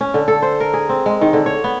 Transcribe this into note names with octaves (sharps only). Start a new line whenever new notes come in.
C#4
D3
A4
C5
A#4
G#4
C4
G#3
D#3
D3
C#5
B3